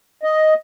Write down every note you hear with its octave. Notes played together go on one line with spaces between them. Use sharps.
D#5